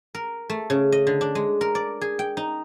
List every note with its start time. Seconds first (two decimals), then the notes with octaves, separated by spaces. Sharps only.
0.15 A#4
0.50 A3
0.70 C#3
0.92 D#5
1.07 D3
1.21 D4
1.35 G#3
1.61 A#4
1.75 D5
2.01 G#4
2.19 G5
2.37 D#4